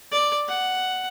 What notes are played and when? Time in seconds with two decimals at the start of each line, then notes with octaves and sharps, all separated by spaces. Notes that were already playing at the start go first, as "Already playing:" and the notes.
0.12 D5
0.48 F#5